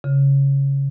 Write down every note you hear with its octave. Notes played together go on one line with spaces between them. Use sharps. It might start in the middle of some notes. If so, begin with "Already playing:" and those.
C#3